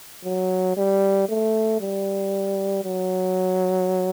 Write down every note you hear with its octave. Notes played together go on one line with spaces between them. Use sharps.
F#3
G3
A3
G3
F#3